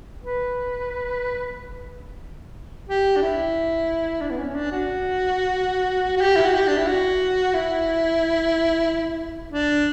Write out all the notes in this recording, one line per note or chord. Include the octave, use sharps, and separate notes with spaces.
B4
G4
D4
E4
D4
B3
C#4
D4
F#4
F#4
G4
E4
F#4
G4
D4
E4
F#4
E4
D4